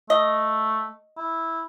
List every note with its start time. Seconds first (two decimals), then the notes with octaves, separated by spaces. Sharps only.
0.10 A3 D#5
1.17 E4